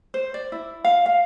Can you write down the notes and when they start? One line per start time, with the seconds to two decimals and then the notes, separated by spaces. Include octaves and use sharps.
0.14 C5
0.34 D5
0.52 E4
0.84 F5
1.06 F5